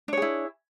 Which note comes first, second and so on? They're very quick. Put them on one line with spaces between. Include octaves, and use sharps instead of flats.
D4 C#5 G#4 E4